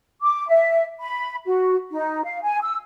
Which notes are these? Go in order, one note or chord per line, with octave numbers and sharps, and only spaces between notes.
D6
E5
B5
F#4
D#4
F5
G#5
E6